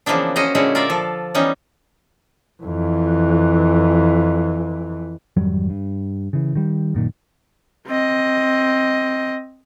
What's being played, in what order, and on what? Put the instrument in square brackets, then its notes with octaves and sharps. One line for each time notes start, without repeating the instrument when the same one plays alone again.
[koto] C#3 E3 F3 A#3 B3 D4
C#4 F#4 C5 D#5 A#5
A#2 D3 G#3 C#4 E4 F#4
F4 A#4 D5 E5 F5
F3 A4
E3 G3 B3 C#4 D#4
[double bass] F2 E3
[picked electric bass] G#1 F2 F#3 G3
G2
C#3 E3
D#3 G3
F#2 A#2 D#3
[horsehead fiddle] C4 D#5